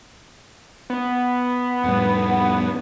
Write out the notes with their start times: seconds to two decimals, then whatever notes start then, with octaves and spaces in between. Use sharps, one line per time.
0.90 B3
1.84 F2 A2 G3